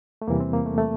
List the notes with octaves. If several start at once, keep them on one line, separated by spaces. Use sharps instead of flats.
A3
E2 C3 E3 G3 A#3
C4
A#3
A3
A3